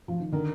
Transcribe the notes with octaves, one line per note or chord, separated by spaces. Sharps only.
F3
D#3
D3 D#3